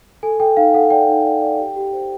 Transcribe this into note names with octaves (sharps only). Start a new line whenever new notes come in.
A4 G#5
A4 G5
D#4 F5
A4 F#5
D5 G5
D#4
D5
D5
G4
G4
C5